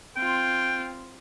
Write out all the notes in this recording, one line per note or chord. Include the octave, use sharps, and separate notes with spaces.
C4 F4 G5